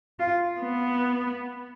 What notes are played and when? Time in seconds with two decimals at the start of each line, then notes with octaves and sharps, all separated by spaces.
0.19 F4
0.60 B3